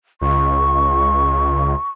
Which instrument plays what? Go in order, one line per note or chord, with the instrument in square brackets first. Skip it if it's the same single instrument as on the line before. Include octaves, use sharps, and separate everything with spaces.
[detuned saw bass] C#2 [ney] C#6